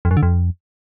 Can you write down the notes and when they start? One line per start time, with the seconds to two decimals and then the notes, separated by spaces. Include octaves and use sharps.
0.05 F2
0.11 F#2
0.17 D3
0.23 F2